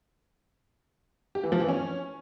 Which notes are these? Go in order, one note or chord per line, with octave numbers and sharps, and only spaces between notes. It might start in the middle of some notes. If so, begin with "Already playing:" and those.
G4
E3
F3
E3
C#4